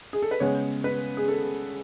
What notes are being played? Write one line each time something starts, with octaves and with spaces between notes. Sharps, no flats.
G#4
A4
B4
C#3 G#3 B3 C#5
B4
G#4
A4